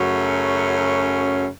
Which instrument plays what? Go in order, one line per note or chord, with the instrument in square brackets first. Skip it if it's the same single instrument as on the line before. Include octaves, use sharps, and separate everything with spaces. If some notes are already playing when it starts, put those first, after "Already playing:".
Already playing: [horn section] F#2 C#3 F#3 A3 C#4